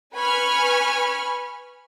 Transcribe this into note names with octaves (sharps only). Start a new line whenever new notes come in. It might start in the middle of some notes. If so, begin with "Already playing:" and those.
B4 G#5 B5 C#6 F6